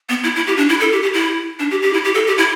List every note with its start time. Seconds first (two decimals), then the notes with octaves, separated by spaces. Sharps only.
0.09 B3
0.24 E4
0.36 E4
0.47 G4
0.57 D4
0.69 E4
0.80 A4
0.92 G4
1.03 G4
1.14 E4
1.59 D4
1.71 G4
1.82 G4
1.93 E4
2.05 G4
2.15 A4
2.27 G4
2.38 E4